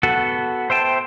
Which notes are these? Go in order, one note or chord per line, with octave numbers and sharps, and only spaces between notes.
B3 F#4 A4 F#5
C5 E5 G5 A5